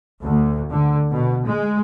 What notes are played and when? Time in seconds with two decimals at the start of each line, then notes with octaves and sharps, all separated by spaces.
0.23 D2
0.71 D3
1.12 B2
1.47 G#3